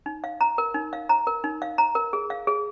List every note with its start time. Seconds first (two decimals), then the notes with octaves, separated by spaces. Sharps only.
0.06 D#4
0.24 F5
0.41 A#5
0.58 A#4
0.74 D#4
0.93 F5
1.09 A#5
1.27 A#4
1.44 D#4
1.62 F5
1.78 A#5
1.95 A#4
2.13 G#4
2.30 F5
2.47 G#4